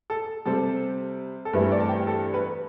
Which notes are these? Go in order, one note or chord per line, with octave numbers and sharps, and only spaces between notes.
A4
C3 G3 C4 A4
A4
G2 E3 A3 C4 B4
D5
A5
G5
A4
B4